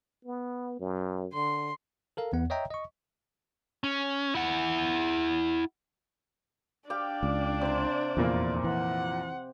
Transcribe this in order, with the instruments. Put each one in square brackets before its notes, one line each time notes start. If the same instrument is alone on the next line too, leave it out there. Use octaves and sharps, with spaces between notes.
[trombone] B3
F#2
[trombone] D3 [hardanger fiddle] C6
[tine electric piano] A4 A#4 F5
E2 B3 F#5
C#5 D#5 E5 G5 A#5
D#5 C#6
[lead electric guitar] C#4
E4 F#5
[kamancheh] D4 D5 [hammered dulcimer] G4 F5 G5
[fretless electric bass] C#2
[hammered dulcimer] C3 C5
[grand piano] F1 A#2 A#3 [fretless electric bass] E2
[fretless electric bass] E3 [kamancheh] F#5